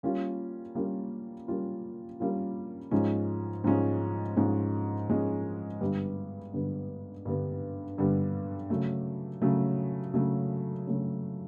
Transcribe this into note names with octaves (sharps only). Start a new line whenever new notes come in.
G3 A#3 C#4 F4
G3 A#3 C#4 F4
G3 A#3 C#4 F4
G3 A#3 C#4 F4
G#2 F3 G#3 C#4
G#2 F3 G#3 C#4
G#2 F3 G#3 C#4
G#2 F3 G#3 C#4
G2 D3 G3 B3
G2 D3 G3 B3
G2 D3 G3 B3
G2 D3 G3 B3
C#3 F#3 A3
C#3 F#3 A3
C#3 F#3 A3
C#3 F#3 A3